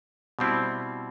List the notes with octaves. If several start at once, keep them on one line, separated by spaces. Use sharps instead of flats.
B2 G3 C4 E4